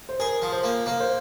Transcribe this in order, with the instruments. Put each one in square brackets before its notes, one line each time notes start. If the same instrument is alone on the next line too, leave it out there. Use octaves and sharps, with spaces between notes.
[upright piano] C5
[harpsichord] G#4 [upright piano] A#4
[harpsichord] F3
[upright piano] C5
[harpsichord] A#3
[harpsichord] A#3 [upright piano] A#4
[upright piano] C5